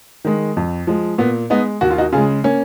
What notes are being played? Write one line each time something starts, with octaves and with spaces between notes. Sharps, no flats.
D#3 G#3
F2
F3 G#3
A#2 B3
G#3 B3 D#4
D#2 F#4
F4
D#4 F#4
C#3 G#3 F4 G#4
A#3 C#4